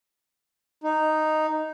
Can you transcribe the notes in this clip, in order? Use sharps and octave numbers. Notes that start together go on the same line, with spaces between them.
D#4